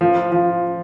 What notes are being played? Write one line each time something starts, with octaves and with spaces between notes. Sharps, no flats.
F3
F3